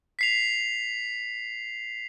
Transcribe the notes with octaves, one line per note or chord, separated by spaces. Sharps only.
B6 C7 F7